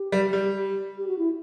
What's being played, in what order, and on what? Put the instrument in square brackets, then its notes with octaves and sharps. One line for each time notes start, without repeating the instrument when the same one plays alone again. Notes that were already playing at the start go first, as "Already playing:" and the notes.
Already playing: [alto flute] G4
[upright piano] G3
G3
[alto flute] G4
F#4
E4